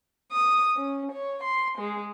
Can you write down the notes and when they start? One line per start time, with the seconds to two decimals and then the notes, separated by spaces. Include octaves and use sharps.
0.32 D#6
0.76 C#4
1.12 C#5
1.44 C6
1.78 G#3